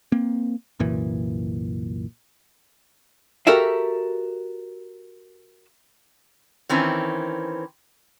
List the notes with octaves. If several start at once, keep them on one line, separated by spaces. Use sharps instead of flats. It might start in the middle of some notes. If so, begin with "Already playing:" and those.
A#3 C4
C2 F#2 A#2 E3
F#4 G4 A4 A#4 E5 F5
D#3 E3 C4 C#4